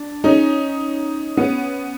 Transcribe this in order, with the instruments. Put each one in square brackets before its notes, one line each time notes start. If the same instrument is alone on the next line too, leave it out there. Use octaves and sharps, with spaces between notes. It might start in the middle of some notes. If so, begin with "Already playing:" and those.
Already playing: [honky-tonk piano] D4
C#4 D#4
B3 C#4